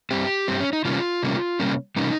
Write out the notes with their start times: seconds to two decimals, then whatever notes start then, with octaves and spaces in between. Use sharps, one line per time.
0.11 G2 G3 C4 G4
0.48 G2 G3 C4
0.60 C#4
0.73 D#4
0.85 C3 G3 A#3 C#4 F4
1.23 C3 G3 A#3 C#4
1.60 C3 G3 A#3 C#4
1.96 C3 G3 A#3 C#4 D#4